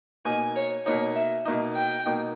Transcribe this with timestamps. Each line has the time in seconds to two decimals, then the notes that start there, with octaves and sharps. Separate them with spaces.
0.25 B2 A#3 D#4 G#5
0.56 C#5
0.86 B2 A#3 D#4 C#5
1.15 E5
1.45 B2 A#3 D#4
1.76 G5
2.06 B2 A#3 D#4